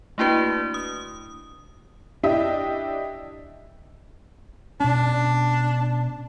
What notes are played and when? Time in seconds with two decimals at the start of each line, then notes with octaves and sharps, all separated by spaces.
0.18 A3 A#3 D4 E4 F#4 B4
0.74 D#6
2.23 D4 E4 G4 D#5 E5
4.80 B2 C#4 D4